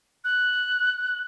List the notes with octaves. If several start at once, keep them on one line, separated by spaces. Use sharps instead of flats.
F#6